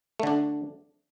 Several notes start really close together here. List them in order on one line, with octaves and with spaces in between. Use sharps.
A3 D3 D4